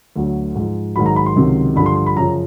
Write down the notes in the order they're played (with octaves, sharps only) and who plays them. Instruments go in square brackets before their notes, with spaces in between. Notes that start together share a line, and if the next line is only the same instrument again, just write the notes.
[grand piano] D2 D3 F#3
G#2 F3
G#2 D#3 F#3 B5
A#5
B5
C6
C#2 C3 D#3 F#3
G2 D3 F3 B5
C6
C6
B5
F#2 C#3 F3 A#5